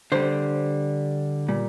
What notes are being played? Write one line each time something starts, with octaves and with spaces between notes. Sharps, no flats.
D3 G3 C5
A#2 G3